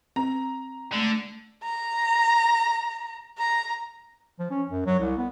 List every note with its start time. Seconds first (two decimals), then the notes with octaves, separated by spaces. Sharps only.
0.16 C4 A#5
0.92 D3 G#3 A3
1.64 A#5
3.38 A#5
4.39 F3
4.51 C#4
4.70 F#2
4.86 F#3
5.00 C2
5.17 B3